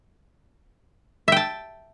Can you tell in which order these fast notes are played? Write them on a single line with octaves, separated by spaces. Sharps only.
E5 G5 A5